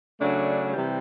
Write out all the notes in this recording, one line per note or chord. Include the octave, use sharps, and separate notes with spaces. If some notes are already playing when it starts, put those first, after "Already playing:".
C#3 F#3 A3 D4
C3 E3 G3